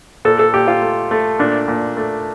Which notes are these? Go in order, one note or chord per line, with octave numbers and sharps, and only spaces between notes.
A#2 A4
A4
A#2 G4
F4
A3
A3
A#2 D4
A#2
A3